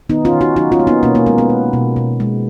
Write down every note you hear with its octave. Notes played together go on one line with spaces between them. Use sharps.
D#3 B3 D#4
C#4 F4
D#3
D#4 F#4
F#3 D#4 F#4
C#4 F4
A#3
B3 D#4
B2 A#3 C#4
A#3
G#3 B3
B3
G#3
B2
B2
G#3